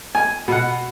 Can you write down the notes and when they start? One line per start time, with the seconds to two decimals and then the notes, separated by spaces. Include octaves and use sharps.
0.15 G#5
0.48 B2 F#5